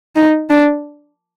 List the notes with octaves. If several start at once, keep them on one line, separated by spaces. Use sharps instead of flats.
D#4
D4